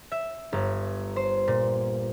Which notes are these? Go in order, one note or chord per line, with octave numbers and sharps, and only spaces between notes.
E5
G1
C5
A#2